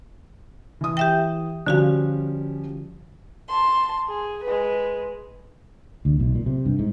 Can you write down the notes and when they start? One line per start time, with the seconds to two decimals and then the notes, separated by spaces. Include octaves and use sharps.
0.81 E3 D#6
0.97 G4 E5 G5
1.67 D3 F3 G3 C#4 F#4 F5
3.48 A5 C6
4.08 G#4
4.44 G#3 B4
6.05 D2
6.20 B1
6.35 A#2
6.46 C3
6.66 G2
6.79 G#2